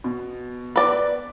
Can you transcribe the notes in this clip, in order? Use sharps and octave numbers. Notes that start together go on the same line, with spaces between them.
B2
B4 D5